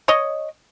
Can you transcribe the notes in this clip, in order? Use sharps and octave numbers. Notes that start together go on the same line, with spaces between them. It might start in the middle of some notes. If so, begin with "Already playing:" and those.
C#5 D#5